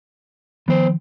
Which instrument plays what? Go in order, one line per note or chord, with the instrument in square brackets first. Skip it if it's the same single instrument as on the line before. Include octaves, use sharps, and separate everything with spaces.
[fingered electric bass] D#3 F3 [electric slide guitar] B3 C5